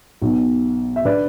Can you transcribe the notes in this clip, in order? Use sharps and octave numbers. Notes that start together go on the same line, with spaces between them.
B1 B2
E5
D3 B4 D5